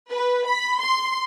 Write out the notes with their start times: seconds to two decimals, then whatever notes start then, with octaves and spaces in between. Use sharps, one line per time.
0.10 B4
0.48 B5
0.80 C6